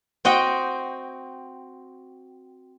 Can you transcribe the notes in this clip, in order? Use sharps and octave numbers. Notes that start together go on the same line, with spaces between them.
C4 F#4 D#5 F#5 G5